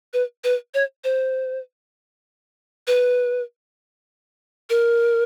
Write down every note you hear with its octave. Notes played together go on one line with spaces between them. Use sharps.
B4
B4
C#5
C5
B4
A#4